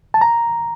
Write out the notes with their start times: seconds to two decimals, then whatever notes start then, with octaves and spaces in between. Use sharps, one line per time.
0.14 A5
0.21 A#5